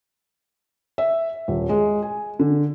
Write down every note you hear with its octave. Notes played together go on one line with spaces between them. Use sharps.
E5
D#1
G#3
G#5
D3